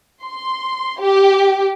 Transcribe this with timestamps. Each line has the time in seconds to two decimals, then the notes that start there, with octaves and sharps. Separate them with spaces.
0.23 C6
1.00 G4